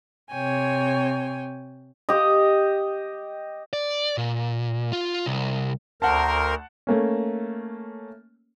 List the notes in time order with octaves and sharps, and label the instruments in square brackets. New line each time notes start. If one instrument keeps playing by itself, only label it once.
[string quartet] C3 C#5 G5 G#5
[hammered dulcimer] G4 D#5
[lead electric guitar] D5
A#2
F4
C2
[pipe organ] D2 C5 [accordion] A#4 [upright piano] F#5 A5
[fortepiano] A3 A#3 C#4